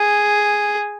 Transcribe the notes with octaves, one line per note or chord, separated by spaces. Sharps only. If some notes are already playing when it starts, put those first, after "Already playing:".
Already playing: G#4